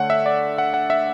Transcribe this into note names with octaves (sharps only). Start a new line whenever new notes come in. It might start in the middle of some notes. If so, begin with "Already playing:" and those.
Already playing: D3 A3 C#5 F#5
E5
D5
F#5
F#5
E5